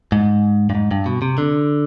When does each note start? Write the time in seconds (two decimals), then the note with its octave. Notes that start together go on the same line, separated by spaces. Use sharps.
0.12 G#2
0.70 G2
0.75 G#2
0.91 G2
1.06 B2
1.22 C3
1.38 D3